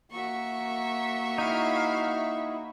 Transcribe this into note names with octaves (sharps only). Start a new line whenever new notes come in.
A#3 F#4 E5 C#6
D#4 E4 F5